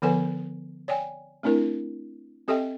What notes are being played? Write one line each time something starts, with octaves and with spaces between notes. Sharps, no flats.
D3 F3 B3 A4 B4 G#5
C#5 D5 G5 G#5
A3 C4 D4 E4 A#4
C4 G4 A4 D#5 E5 G5